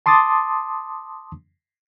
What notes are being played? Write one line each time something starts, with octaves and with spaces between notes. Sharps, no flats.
A5 C6 D6 D#6 A6